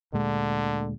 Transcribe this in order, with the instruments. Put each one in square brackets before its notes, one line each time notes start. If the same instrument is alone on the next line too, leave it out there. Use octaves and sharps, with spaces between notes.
[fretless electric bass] D2 A#2 G#3 [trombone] D3